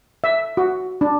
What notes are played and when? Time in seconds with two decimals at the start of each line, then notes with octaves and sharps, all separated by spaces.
0.24 E5
0.57 F#4
1.01 D4